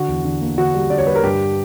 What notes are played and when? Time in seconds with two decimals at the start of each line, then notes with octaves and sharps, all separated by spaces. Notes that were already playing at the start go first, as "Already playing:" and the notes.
Already playing: D3 F#4
0.08 E2
0.25 D3
0.41 A#3
0.57 D3 F#4
0.74 G3
0.90 D3 D5
0.98 C#5
1.07 G3 B4
1.15 A#4
1.24 G2 G4